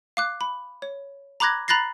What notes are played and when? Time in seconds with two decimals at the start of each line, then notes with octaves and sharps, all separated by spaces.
0.17 F5 D6 F#6
0.41 B5
0.82 C#5
1.40 A#5 B5 D6 F#6 G#6 A#6
1.68 A#5 B5 F#6 A6 A#6 C7